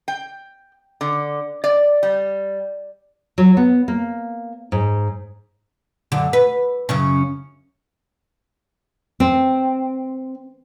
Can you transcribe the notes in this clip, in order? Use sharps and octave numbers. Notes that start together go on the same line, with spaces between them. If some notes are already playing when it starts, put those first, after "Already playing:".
G5
D3
D5
G3
F#3
B3
A#3
G#2
F#2 D3
B4
F#2 C#3 C#4
C4